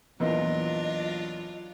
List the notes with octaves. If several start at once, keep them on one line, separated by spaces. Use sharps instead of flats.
E2 A#2 E3 F#3 D4 F4 D#5